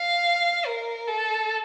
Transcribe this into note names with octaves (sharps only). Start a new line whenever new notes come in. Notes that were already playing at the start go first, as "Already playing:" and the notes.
Already playing: F5
A#4
A4